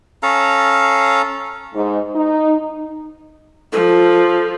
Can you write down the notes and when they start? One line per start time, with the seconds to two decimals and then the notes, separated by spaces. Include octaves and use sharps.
0.23 C#4 A4 F5 A#5
1.75 G#2
2.15 D#4
3.73 F3 A4